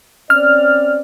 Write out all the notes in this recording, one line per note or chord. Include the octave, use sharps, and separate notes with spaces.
C4 C#4 D5 F6